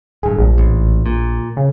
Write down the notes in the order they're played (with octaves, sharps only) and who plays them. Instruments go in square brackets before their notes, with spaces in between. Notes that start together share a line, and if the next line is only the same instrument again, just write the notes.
[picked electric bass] D1 G2 [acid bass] G#4
[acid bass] A#1
[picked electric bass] A1
A#2
[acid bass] C#3